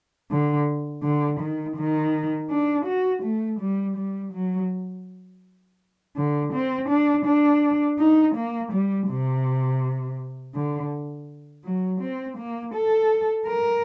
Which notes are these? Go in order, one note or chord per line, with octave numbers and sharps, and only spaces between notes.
D3
D3
D#3
D#3
D4
F#4
A3
G3
G3
F#3
D3
C4
D4
D4
D#4
A#3
G3
C3
D3
F#3
C4
A#3
A4
A#4